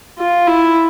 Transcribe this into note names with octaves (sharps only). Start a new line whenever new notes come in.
F4
E4